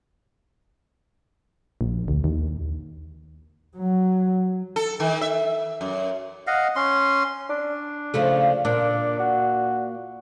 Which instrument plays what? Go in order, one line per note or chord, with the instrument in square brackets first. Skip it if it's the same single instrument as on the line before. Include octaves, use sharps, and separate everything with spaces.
[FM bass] A#1
D2
D#2
[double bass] F#3
[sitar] A4
D#3
E5
F#2
[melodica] D#5 F5 F#5
C#4 C6
[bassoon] D4
[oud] C#3 F3 A3
[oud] A#2 [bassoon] D4
[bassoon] F#4